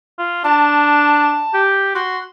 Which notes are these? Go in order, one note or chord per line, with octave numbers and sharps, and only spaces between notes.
F4
D4 A5
G4
F#4 C6